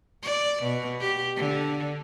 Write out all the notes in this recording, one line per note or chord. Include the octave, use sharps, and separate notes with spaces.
D5
B2
G4
D3